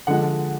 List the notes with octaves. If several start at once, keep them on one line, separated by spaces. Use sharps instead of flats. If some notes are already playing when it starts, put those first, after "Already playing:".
D3 F3 G#3 F#5